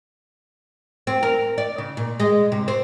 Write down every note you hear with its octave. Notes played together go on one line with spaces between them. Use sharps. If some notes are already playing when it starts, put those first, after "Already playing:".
C4
A#4
D5
C#3
A#2
G#3
C3
C4